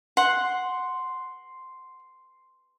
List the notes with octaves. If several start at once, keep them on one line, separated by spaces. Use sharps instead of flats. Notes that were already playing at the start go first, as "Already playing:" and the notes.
F#5 C6